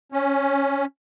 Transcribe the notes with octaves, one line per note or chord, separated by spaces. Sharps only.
C#4